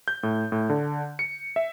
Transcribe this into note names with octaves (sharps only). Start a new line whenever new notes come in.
G6
A2
A2
D3
C#7
E5